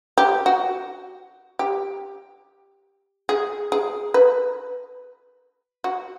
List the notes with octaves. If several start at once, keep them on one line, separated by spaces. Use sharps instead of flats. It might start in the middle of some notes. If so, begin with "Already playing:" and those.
G4
F#4
G4
G#4
G#4
B4
F#4